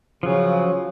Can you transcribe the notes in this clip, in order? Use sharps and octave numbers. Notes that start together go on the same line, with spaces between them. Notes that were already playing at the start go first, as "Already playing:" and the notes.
C#3 F3 F#3